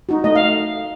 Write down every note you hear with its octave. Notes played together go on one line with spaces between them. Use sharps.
D#4 F#4
A3 D#5
F5